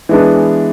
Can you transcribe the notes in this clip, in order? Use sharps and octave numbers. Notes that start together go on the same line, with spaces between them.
E3 G#3 B3 D4